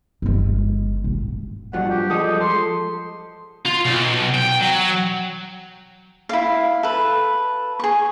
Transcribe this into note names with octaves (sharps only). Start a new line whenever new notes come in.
G1 G#3
A1
G2 F3 F#3 F#5
G4
F3 G#3 A4 D#6
G4
A4 C6
F4
B1
G5
F#3
E4 F5
A4 B4
G#4 C#6